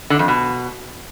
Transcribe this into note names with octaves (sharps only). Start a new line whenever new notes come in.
D3
F2
B2